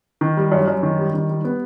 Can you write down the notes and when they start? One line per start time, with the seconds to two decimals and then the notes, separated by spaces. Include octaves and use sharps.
0.21 D#3
0.37 G3
0.52 F#2
0.67 F#2
0.83 D#3
0.99 G3
1.14 D#3
1.29 G3
1.44 B3